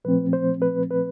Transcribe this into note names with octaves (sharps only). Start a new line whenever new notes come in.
A#2 F3 A3 C4 B4
C5
B4
B4